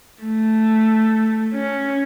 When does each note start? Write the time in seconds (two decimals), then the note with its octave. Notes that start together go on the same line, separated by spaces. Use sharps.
0.23 A3
1.54 C#4